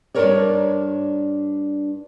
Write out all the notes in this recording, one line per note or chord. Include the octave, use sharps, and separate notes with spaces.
G2 E3 D4 A#4 C#5 D5